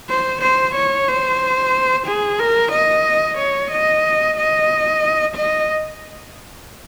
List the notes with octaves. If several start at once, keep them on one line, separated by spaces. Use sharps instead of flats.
C5
C5
C#5
C5
G#4
A#4
D#5
C#5
D#5
D#5
D#5